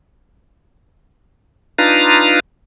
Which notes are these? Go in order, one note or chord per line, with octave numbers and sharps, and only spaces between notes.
D4 D#4 F4 B4 F5 A#5